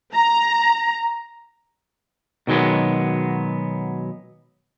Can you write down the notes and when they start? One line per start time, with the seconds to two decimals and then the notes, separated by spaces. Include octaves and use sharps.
0.14 A#5
2.47 B2 D#3 F#3 G#3 B3